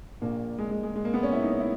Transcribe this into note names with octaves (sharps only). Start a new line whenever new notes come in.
A#1 A#2 A#3
G#3
G#3
G#3
G#3
A#3
B3
C#4
E4
D#4
C#4
E4